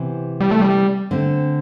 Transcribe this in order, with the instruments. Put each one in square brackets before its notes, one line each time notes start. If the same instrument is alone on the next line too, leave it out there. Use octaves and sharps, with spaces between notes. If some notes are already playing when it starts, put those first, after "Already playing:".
Already playing: [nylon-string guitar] C3 E3 B3
[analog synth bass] G3
A3
G3
[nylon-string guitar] D3 A3 C4